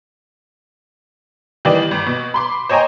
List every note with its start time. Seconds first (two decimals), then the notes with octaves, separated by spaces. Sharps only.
1.65 D#3 E3 G3 D5
1.91 G1
2.06 B2
2.34 B5 C6 D6
2.70 C5 C#5 D#5 G5 G#5 A#5